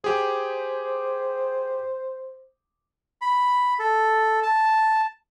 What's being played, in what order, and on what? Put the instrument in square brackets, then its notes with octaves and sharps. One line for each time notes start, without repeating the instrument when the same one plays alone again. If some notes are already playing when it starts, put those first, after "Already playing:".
[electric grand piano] G4 G#4 [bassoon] C5
[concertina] B5
A4
A5